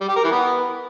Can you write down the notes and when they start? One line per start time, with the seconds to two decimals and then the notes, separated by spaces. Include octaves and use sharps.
0.01 G3
0.08 G4
0.16 A#4
0.24 E3
0.32 B3